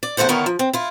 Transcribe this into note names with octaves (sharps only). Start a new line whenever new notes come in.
D5
E2 D3 A3 C5 F#5
D3 D#3 B3 E4 A#4 C#5
F3
C4
E4 F4